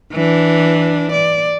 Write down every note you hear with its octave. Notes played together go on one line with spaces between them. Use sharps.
E3 D4
D5